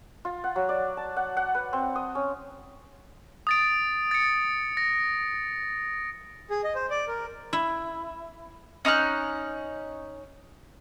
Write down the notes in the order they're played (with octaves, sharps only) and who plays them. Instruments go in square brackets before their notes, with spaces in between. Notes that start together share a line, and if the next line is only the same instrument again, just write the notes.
[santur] F4
F#5
F#3
D5
A5
F#5
F#5
B4
C4
D#6
C#4
[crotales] D#6 A6 D7
A6 C#7
A#6
[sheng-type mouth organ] G#4
D#5
C5
D5
A#4
[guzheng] E4
[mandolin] C#4 D#4 F6 F#6